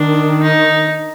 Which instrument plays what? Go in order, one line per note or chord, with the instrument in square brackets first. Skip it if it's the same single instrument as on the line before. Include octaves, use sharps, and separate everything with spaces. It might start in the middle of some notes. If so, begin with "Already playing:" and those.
Already playing: [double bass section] D#3 [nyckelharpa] D4
[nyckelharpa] D#4